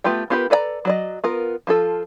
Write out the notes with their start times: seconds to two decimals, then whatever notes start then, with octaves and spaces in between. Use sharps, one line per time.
0.04 A3 B3 F4 G4 G5
0.30 B3 F4 G4 A#4 B4
0.50 A4 B4 D5 F#5 A#5
0.85 F#3 D5 D#5
1.24 B3 F4 A#4
1.67 F3 F4 A4